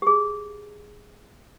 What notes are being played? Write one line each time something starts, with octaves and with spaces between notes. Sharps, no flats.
G4 G#4